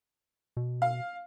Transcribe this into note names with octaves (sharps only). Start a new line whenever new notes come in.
B2
F5